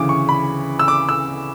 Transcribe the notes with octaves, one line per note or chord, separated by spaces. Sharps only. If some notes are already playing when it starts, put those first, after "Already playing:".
Already playing: D2 C#3 E3 D6
C#6
B5
E6
D6
E6